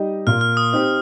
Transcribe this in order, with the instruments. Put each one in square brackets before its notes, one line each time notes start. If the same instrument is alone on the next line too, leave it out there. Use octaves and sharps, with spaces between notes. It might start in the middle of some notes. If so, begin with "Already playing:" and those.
Already playing: [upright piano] G3 D#4 G4 D#5
[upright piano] A#2 A#3 F4 [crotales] F6
[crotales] F6
D#6
[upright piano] C4 D#4 G4